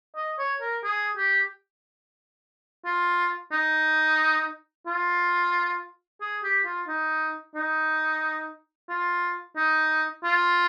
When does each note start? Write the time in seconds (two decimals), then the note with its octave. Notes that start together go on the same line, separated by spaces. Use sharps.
0.16 D#5
0.38 C#5
0.61 A#4
0.83 G#4
1.17 G4
2.85 F4
3.52 D#4
4.86 F4
6.21 G#4
6.43 G4
6.65 F4
6.88 D#4
7.55 D#4
8.89 F4
9.57 D#4
10.24 F4